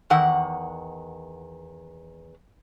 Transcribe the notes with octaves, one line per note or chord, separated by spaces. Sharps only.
E2 D#3 F#5